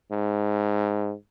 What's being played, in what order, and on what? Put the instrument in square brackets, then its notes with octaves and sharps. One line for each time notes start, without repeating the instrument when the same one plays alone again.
[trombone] G#2